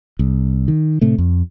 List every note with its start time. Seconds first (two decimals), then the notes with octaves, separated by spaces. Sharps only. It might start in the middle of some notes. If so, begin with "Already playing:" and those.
0.19 C2
0.68 D#3
1.01 A2 C3 A3
1.18 F2